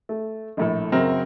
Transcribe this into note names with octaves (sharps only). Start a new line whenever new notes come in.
A3
A#1 A2 A4
F#2 C#3 C4 A#4